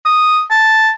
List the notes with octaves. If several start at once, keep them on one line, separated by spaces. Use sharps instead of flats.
D#6
A5